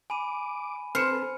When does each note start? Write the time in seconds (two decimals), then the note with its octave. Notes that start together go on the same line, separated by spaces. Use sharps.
0.10 G#5 B5 D6 D#7
0.95 C4 A4 B4 C5 F6 C#7 E7